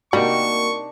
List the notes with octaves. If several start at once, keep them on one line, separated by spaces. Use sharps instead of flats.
C3 G3 A#3 D4 D#4 F#4 C#6